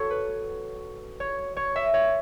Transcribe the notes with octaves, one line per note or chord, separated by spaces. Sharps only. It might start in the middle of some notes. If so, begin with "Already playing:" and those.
Already playing: F#4 A4 C#5
B4
C#5
C#5
E5
C#5